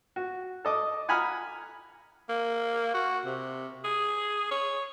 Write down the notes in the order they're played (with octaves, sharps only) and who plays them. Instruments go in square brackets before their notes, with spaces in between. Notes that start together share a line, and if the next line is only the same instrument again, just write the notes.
[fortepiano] F#4
A4 D#5 D6
F#5 G#5 A#5 B5 D#6 F6
[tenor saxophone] A#3
F#4
C3
G#4
C#5